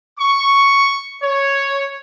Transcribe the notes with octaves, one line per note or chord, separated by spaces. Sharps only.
C#6
C#5